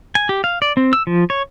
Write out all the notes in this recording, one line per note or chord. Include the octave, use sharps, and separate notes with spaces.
G#5
G4
F5
D5
C4
E6
F3
C#5